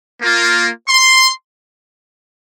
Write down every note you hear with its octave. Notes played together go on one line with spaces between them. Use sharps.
A#3 F4
C6